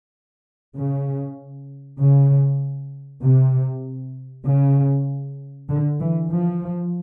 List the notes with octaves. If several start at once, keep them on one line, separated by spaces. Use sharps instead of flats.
C#3
C#3
C3
C#3
D3
E3
F3